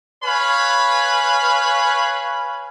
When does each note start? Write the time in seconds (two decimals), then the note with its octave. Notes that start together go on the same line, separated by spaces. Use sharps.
0.24 B4 C#5 F5 G#5 B5